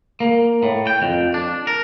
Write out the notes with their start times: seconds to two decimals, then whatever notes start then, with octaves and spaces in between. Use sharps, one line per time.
0.20 A#3
0.63 A2
0.87 G5
1.02 F2
1.34 D4
1.67 A#4